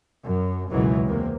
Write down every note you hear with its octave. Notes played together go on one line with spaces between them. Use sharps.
F#2
C#2 F#2 B2 E3 F#3 G#3
E2 C3 A#3